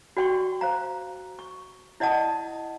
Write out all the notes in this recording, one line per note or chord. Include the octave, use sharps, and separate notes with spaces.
F#4 D5 G5 C6 C#6
C5 F5 A#5
C#6
E4 D5 D#5 F#5 A5 D#6